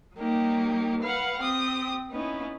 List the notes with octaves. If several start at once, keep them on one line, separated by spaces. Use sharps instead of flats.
F#3 G3 A#3 D#4 G4
B4 F5 F#5
C4 G4 D#6
B3 C#4 D#4 E4